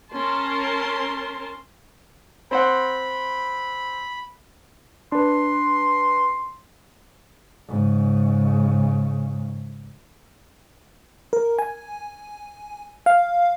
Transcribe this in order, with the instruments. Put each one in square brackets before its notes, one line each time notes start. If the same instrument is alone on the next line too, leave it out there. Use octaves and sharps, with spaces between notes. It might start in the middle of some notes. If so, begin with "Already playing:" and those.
[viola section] C#4 A#4 A5 C6
[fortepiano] C4 C5 F#5 [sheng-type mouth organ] B5
[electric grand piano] D4 B4 [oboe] C6
[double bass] G#2 C#3
[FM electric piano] A#4
G#5
F5